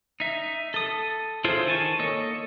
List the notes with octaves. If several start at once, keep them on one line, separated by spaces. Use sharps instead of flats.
D#4 E5
A4 D#6
E4 F4 G#4 A4 C5
D#3 G#5 A5 C#6
A#3 A4 C#5 D#5